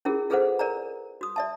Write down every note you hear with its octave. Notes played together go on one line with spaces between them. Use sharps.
C#4 E4 F4 G4 G#4 A#4
F4 G#4 A4 B4 C5 F#5
A#4 D5 G#5 A#5
F#4 D#6
D5 E5 A5